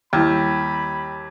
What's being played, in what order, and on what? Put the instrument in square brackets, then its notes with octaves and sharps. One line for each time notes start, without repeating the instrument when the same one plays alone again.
[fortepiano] D#2 [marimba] G3 E4 F6 [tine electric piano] G5 E6 [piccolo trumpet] B5